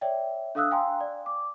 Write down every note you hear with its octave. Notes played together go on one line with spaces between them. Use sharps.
C#5 D5 E5 G5
D4 A4 F5 D#6 E6 F#6
F5 G5 G#5 A#5 C6
D5
D6